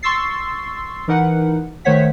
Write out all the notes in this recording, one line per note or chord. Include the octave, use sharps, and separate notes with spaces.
C6 C#6 E6 A6 C7
E3 D#4 A#4 B4 F#5
D#3 A3 C5 C#5 F#5 B6